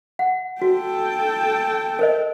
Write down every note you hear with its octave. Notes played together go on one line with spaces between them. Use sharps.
F#5
F#4 A4 G5
A#4 C5 D#5